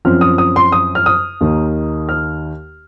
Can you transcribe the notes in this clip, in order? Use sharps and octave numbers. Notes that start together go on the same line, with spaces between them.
F#2 F3 C4 F6
D#6
D#6
C6
D#6
F6
D#6
D#2 D#3 A#3
F6